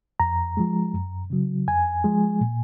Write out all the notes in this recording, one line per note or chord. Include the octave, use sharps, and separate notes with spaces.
F2 A#5
F3 G#3
F#2
C#3 F#3
F2 G#5
F3 G#3
A#2